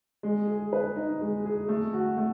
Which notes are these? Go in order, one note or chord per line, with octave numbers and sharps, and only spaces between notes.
G#3
G#4
B4
D#4
G#3
G#4
A3
F#4
A3